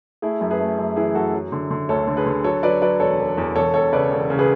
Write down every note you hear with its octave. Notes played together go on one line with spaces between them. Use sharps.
A3 E4 G#4
F#2
G#4 B4
A3
F#2
E3 E4 G#4
F#2 F#4 A4
F#3
D3
D3
D2 A4 C#5
D3
G#4 B4
D3
F#3 A4 C#5
F#3 B4 D5
F#3 B4 D5
E1 A4 C#5
E1
E2
E1 A4 C#5
E1 A4 C#5
C#3 B4 D5
E1
C#3
G#4 B4